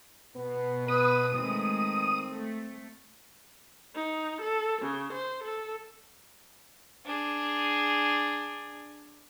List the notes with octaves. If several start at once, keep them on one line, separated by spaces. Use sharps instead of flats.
B2 B3
B3 B4 D#6
D#3 G#3 A3 C4
A3
D#4
A4
C#3
C5
A4
D4 G#4